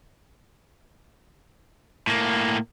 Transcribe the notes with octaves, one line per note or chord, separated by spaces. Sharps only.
A2 A#3